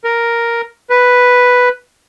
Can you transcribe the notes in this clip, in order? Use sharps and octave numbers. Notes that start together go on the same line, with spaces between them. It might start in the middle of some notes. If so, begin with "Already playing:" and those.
A#4
B4